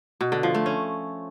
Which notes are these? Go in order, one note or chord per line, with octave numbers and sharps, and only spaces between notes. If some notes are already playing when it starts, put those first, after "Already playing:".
B2
D3
F3
A3
C#4